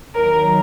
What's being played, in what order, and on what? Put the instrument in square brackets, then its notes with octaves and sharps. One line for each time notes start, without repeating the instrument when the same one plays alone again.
[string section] D#2 D#3 F#3 A#4